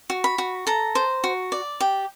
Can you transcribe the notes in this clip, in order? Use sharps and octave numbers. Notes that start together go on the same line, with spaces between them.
F#4
B5
F#4
A4 A#5
C5
F#4
D5
G4